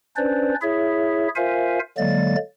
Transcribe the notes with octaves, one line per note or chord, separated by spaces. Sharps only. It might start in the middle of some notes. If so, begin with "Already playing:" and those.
C#4 D4 B4 C5 D5
E4 G#4 C#5 E5
F4 A#4 C5 E5 F5 G#5
D3 F#3 G#3 A#3 D5 A6